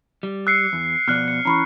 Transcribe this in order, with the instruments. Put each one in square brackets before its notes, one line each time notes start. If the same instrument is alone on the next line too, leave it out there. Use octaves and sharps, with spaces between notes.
[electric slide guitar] G3
[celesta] E6 [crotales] F#6 C7 C#7
[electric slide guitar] E2
[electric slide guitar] B2 F3 D5 [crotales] F6 F#6
[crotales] C#7
[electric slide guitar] E3 C#4 [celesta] A#5 B5 C#6